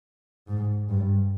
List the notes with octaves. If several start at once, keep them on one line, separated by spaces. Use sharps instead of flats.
G#2
G2